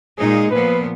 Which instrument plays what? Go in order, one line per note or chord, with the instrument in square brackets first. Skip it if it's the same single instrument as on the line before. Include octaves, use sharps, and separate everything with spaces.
[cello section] A#2 G#3 D#4 [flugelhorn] G#4
[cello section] A#2 F3 B3 [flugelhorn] B4